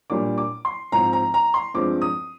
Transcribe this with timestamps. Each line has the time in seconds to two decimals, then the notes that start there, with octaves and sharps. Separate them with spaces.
0.10 A#2 G3 A#3 D4 D6
0.38 D6
0.65 C6
0.92 G#2 F3 C4 A#5
1.13 A#5
1.34 A#5
1.54 C6
1.74 G2 F3 G#3 C4 D6
2.02 D#6